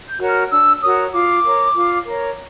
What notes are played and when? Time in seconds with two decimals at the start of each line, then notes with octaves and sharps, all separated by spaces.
0.08 G6
0.19 F#4 A#4 C#5
0.29 F6
0.50 D4 E6
0.81 F#4 A#4 C#5 D#6
1.12 F4 D6
1.43 A#4 C#5
1.74 F4
2.05 A#4 C#5